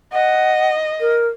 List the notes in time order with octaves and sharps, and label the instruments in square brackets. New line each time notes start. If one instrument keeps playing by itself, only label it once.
[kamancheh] D#5 [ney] F#5
[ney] A#4